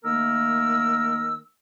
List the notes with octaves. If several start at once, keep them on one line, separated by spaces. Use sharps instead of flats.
D#3 A3 A#3 A#4 E6